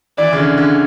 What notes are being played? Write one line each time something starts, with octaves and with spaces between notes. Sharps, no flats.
E3 D5
C#3
D3
D3